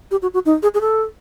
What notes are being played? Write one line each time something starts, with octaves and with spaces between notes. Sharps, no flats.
G4
F#4
F#4
D#4
G#4
G#4
A4